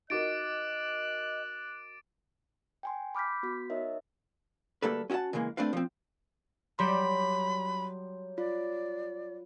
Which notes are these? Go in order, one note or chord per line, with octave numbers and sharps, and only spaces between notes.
D#4 F#4 A#4 D#5 D6 F#6 A6 D7
G5 G#5 C6
B5 D6 F6 G6 B6
B3 F#4 B6
D#4 A#4 C#5 D#5 E5
D2 G3 A#3 A4 B4
C#4 F#4 E5 F#5 A5
C#3 E3 G#3 A#3
A3 C4 D4 B4 F5
F3 C4
F#3 G3 G4 B5 C6
F4 D5